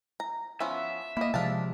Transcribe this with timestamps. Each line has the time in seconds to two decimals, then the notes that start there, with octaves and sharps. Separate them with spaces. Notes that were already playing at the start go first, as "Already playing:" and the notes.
0.20 A#5
0.60 F3 B3 C#4 E5
1.17 A#3 E4 D#5
1.34 C3 F3 G#3 D4 F5 A5